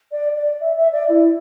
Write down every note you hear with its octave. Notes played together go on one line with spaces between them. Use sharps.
D5
D5
E5
E5
D5
E4